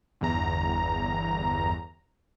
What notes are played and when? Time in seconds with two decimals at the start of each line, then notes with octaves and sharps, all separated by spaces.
0.21 G1 E2 A#5